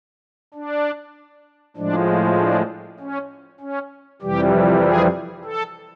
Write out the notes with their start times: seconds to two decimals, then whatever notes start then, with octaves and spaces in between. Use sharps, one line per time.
0.54 D4
1.77 A2 F3 G#3 D4
2.38 D4
3.00 C#4
3.60 C#4
4.22 F2 C3 E3 G3 G4
4.84 G#4
5.44 A4